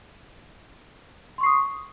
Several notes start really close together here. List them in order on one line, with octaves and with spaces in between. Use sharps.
C6 C#6 C7 D#6